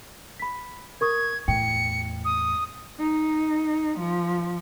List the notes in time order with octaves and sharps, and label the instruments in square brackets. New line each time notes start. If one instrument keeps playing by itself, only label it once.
[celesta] B5 B6
[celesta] A#4 C#6 D#6 [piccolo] G#6
[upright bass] E2 A2 [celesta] G5 [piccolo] C#7
[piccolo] D#6
[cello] D#4
F3